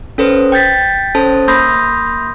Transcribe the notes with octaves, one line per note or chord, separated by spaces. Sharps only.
C#4 A4 B4 C5
G5 G6 A6 B6
C#4 A4 C5 A5
A#3 B5 C6 D#6 G6 A#6